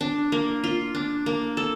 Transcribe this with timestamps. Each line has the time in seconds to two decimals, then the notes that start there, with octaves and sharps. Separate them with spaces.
0.01 D4
0.32 A#3
0.64 F4
0.95 D4
1.26 A#3
1.57 A4